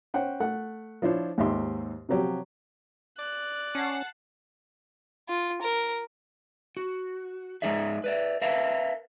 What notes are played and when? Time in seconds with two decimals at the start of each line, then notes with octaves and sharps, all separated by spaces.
0.14 C#4 C5 F#5 G5
0.40 A3 F#5
1.02 F3 D4 E4 C5 C#5
1.38 D#2 G#2 D#4 G4 E5 C6
2.09 C3 F3 F#3 G4
3.19 D5 F#6
3.75 C#4 F#5 A5 C7
5.29 F4
5.62 A#4
6.77 F#4
7.62 G#3 A#3 D#4 G#4 D5 E5
8.04 B4 D5 E5
8.42 A#4 B4 E5 F5